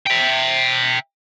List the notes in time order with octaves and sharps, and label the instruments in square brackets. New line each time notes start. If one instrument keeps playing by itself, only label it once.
[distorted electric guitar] E5 G5